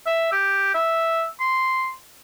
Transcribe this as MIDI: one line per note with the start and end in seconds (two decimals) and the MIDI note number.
0.06 0.29 76
0.32 0.69 67
0.75 1.25 76
1.40 1.91 84